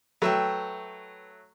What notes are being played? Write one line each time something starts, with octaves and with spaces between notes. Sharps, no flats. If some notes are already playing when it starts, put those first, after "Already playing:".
F#3 A3 B4 E5 G5